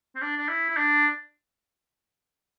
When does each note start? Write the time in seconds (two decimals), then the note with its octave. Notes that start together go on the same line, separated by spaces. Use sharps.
0.16 C4
0.22 D4
0.37 D4
0.48 E4
0.70 E4
0.77 D4